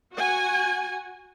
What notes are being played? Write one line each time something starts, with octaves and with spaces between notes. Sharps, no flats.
F#4 F#5 G#5